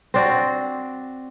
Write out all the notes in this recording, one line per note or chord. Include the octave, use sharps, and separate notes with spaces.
C4 D4 F#4